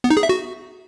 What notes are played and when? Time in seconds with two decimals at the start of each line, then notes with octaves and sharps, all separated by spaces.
0.04 B3
0.10 D#4
0.17 G#4
0.23 E5
0.29 F#4